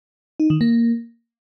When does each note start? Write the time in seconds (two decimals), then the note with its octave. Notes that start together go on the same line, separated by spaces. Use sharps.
0.40 D#4
0.50 D#3
0.61 A#3